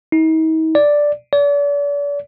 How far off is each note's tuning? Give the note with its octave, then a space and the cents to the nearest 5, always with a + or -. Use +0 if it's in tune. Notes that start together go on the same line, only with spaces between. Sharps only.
D#4 +45
D5 +0
D5 -40